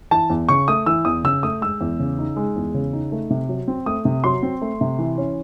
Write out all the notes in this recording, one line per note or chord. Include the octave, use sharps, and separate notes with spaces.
E3 A5
E2
C#3 C#6
A3 D#6
E3 E6
E2 D#6
C#3 E6
A3 D#6
G#3 E6
E2
C#3
D#4
G#3
E2
C#3
D#4
A3
C3
F#3
C4
A3 D#6
C3
F#3 C6
C4
A3
C3
E3
C#4